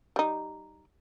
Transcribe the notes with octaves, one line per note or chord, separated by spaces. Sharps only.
G3 D#4